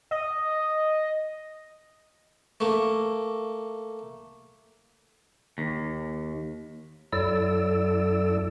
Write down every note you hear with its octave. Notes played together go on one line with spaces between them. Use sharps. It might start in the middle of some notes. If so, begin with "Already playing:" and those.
D#5
A3 A#3
D#2
F#2 F#3 E4 A4 D5 E6